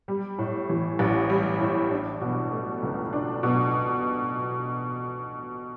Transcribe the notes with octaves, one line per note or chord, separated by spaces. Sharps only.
G3
A2
E3
A1
G3
A2
D4
B2
A3
C#2
D4
B2